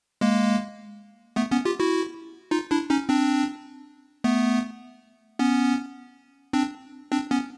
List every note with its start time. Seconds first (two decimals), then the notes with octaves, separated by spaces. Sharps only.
0.21 G#3 A#3
1.36 A3 B3
1.51 B3 C#4
1.65 F4 G4
1.80 E4 F#4
2.51 D#4 F4
2.71 D4 E4
2.90 C#4 D#4
3.09 C4 D4
4.24 A3 B3
5.39 B3 C#4
6.53 C4 D4
7.12 C4 D4
7.31 B3 C#4